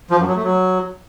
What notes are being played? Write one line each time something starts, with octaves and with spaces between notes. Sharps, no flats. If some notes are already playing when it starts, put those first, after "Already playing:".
F3
F#2
F#3
A3
F#3